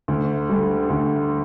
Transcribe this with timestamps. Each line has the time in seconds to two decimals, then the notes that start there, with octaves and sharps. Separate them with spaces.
0.08 D2
0.49 D3 G3
0.90 D2